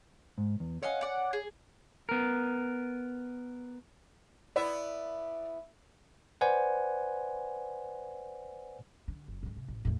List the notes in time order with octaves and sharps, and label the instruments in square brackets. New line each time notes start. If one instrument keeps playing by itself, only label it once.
[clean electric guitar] G#2
E2
[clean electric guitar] C#5 G#5 [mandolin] D#5 F5 F#5
[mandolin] D5 F#5
G#4
[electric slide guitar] B3 A#4
[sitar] B3 E4 E5 [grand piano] D5
[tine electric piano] B4 C5 D5 F#5 G#5
[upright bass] D3
F#1
G#2 D#3
C3
A1
E2 A2